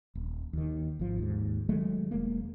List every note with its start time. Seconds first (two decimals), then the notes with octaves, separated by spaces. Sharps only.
0.15 D#1
0.53 D#2 D#3
0.99 G#1 F3
1.19 D#2 G#2
1.69 D#3 F#3 G#3 A3
2.11 E1 G#3 A#3